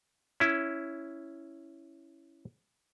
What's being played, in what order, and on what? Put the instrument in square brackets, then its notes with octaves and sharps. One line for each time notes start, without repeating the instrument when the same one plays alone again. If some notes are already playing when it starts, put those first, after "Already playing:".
[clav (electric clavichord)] C#4 E4